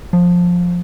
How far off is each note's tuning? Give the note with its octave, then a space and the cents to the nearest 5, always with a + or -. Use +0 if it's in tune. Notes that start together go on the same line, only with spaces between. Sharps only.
F3 +15